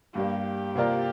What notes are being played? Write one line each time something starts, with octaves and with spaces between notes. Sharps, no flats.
G2 G3 A#3 G4
C3 A#3 F4 A#4 D5